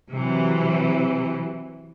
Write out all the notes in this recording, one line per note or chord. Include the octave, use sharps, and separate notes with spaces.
C3 E3 F#3